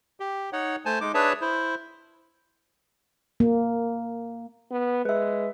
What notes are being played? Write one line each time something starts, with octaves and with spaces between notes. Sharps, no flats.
G4
D#4 C#5 F#5
A3 C5 G#5 A5
G#3 D#4 D6
D4 G#4 B4 C#5 E5 A5
E4 C5
A#3
B3
G#3 B4 E5